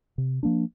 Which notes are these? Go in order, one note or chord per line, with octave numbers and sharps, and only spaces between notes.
C3
F3 A#3 D4